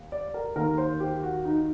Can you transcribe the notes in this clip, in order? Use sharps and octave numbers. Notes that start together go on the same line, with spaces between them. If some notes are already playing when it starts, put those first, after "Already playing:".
Already playing: D#2
D5
A#4
D#2 D#3 A#4
C5
G4
F#4
D#4